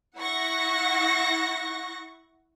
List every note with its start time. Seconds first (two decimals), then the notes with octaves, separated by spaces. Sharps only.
0.18 E4 F#5 C#6 A#6